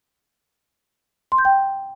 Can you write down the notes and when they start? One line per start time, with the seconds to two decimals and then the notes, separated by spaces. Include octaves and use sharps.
1.32 C6
1.38 G6
1.45 G5